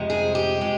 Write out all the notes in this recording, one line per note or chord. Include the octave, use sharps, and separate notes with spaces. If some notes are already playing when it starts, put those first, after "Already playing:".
Already playing: F2 C3 F3 G#3
G#4
G4
G#3